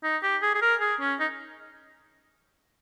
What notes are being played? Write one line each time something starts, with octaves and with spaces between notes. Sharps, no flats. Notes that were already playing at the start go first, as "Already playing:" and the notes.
D#4
G4
G#4
G#4
A#4
G#4
C#4
D#4